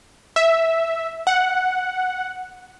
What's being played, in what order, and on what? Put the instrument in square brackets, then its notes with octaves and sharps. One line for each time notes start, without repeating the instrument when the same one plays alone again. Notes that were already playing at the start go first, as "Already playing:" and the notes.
[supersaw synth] E5
F#5